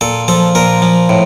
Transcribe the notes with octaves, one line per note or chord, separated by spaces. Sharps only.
A#2 A4
F3 A4
A#2 A#4
F3
A2